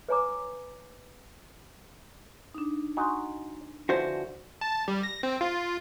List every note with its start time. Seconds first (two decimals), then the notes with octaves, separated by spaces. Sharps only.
0.09 B4 C#5 G#5 A#5 D6
2.54 D4 D#4
2.97 D#4 F#4 G#5 A#5 C6
3.89 D3 E3 F3 F#4 C5
4.61 A5
4.88 G3
5.03 A#6
5.23 C4
5.41 F4